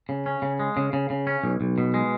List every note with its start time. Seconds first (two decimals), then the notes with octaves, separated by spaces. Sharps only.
0.09 C#3
0.26 C#4
0.42 C#3
0.59 G#3
0.77 C#3
0.93 C#3
1.10 C#3
1.27 C#4
1.44 B1
1.61 B1
1.78 B2
1.94 G#3